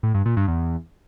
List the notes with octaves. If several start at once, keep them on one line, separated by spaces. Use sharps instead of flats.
A2
G2
A#2
G2
E2